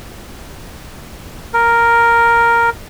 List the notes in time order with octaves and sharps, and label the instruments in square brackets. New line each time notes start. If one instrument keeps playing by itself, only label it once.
[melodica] A#4